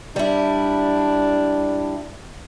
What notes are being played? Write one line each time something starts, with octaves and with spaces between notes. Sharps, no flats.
G3 D4 E4